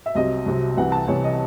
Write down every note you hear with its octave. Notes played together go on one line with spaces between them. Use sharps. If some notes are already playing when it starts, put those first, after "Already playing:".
E5
C2 C3 F#3 D#5
C2 C3 F#3
C2 C3 E3 F#5
A5
C2 C3 E3 C#5
D#5